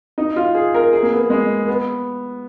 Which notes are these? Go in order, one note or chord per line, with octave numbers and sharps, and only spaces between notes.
D#4
F4
G#4
A#4
G#4
A#3
B3
G#3
B3